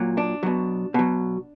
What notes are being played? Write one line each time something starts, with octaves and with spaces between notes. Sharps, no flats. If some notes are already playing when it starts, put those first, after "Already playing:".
Already playing: A#2 F#3
D4
B2 F#3
B2 F#3